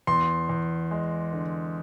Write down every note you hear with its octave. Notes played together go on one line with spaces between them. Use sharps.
E2 C6
E2
G#3
D3